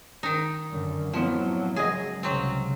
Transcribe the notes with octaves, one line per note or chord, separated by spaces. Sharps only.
D#3 D#4
F#2 D3
F2 A2 F3 F#3 B3
C#2 F#2 G#4 D#5
C2 C#3 F#3 C4